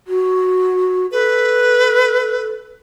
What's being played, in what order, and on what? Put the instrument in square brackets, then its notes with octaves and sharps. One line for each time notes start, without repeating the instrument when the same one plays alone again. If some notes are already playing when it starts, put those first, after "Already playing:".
[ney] F#4
[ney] A4 [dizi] B4